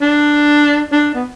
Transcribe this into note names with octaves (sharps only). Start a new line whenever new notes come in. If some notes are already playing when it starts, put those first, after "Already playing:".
D4
D4
B3